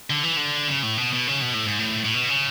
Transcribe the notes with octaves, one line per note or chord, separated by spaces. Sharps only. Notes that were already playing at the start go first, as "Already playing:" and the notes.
D3
E3
D3
C#3
A2
B2
B2
C#3
B2
A2
G#2
A2
A2
B2
C#3